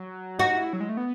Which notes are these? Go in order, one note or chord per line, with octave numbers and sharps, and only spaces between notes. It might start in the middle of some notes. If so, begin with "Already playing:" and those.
Already playing: F#3
D#4 F#4
E4
F#3
G#3
A3
B3